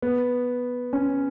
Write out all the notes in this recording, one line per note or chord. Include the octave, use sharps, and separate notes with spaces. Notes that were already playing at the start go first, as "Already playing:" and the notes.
B3
C#4